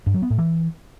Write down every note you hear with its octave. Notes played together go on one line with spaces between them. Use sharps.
G2
F#3
B3
A2
E3